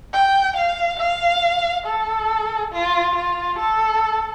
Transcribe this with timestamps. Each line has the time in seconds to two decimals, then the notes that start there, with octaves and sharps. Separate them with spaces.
0.13 G5
0.57 F5
1.00 F5
1.86 A4
2.72 F4
3.15 F4
3.58 A4